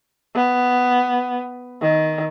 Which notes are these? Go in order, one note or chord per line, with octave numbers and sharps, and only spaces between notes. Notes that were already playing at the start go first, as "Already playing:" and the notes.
B3
D#3